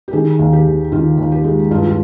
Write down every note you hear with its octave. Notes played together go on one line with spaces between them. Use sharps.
G4
D#3 G#4
D#2
G4
D#2
D#3 F4
D#2
G4
G#3
G2 F4
F4